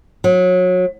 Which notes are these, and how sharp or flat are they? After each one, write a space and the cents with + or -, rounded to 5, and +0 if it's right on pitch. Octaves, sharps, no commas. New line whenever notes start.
F#3 -25